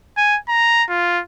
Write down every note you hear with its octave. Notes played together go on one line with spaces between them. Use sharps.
G#5
A#5
F4